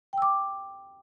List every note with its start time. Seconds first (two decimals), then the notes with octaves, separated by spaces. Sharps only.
0.13 G5
0.18 E6
0.22 D6